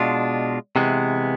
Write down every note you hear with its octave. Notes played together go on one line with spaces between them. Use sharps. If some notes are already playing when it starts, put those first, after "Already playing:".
Already playing: B2 G#3 D4 F4
C3 E3 G#3 B3